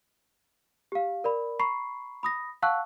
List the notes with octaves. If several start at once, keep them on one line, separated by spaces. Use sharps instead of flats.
G4 F5
A#4 D5 B5
A#5 B5 C#6 C7
B5 D#6 A#6
F5 F#5 A5 C#6 E6 F#6